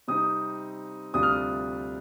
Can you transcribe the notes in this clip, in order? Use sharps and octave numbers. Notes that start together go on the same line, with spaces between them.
C3 G3 C4 D#4 D#6
D2 C3 G3 D4 F4 D#6
F6
D#6